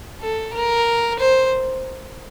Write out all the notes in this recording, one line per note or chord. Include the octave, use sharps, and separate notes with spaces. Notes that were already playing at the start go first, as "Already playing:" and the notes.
A4
A#4
C5